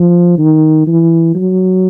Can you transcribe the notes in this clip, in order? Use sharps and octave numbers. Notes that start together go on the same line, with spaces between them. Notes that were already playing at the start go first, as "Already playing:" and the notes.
Already playing: F3
D#3
E3
F#3